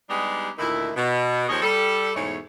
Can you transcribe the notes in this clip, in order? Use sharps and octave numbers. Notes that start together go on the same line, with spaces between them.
G3 G#3 B3 D4 D#4 G4
D2 A#2 D#3 E4
B2
D#2 F3 G#4 C#5 D#5
G3 A4
E2 G#2 B2 A3 C#5